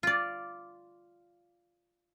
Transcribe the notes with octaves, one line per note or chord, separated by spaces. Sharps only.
F4 D5